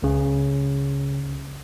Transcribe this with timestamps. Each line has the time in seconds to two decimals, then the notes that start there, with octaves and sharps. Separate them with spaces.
0.02 C#2 C#3